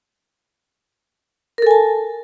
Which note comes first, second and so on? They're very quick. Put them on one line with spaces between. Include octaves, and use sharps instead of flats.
A#4 A4 G#5 A5